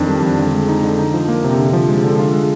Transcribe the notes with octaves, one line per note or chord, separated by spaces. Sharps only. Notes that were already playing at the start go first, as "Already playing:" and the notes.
Already playing: F2 D#3 D4
G3
F2
D3
G#3
D#4
D3
D#4
F3
A#3
C3
D3
F3
G#3
D3
F4
G#3